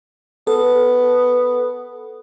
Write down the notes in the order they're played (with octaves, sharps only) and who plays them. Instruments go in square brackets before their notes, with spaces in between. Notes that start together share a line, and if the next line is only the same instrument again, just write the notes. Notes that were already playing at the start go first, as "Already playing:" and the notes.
[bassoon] B3 [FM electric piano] A4